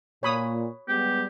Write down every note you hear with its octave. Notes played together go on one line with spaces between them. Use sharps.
A#2 C#5 B5 D#6
G3 G#3 B3 G4